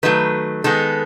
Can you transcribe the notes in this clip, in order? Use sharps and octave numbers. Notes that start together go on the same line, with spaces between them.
D#3 F#3 A3 B4
D#3 G#3 B3 A4